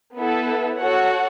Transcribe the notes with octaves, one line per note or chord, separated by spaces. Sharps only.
B3 E4 A4
F#4 A4 C#5 F#5